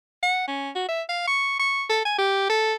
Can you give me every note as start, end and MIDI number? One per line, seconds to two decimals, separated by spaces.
0.23 0.45 78
0.48 0.70 61
0.75 0.87 66
0.88 1.02 76
1.09 1.23 77
1.27 1.56 85
1.59 1.84 85
1.89 2.03 69
2.05 2.16 80
2.18 2.46 67
2.50 2.74 69